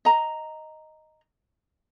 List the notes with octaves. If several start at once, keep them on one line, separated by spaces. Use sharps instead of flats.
D#5 A#5